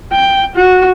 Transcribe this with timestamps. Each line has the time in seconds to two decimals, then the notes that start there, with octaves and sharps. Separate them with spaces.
0.12 G5
0.55 F#4